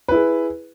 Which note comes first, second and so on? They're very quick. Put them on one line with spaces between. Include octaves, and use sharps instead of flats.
B4 E4 G#4